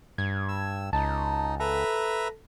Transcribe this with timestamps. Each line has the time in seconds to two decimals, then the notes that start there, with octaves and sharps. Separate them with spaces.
0.18 G2 G#6
0.48 E6
0.93 C#2 D#4 A5
1.60 A4 B4 E5 A#5